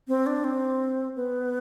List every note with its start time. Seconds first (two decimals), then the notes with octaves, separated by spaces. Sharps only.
0.08 C4
0.26 D4
0.44 C4
1.16 B3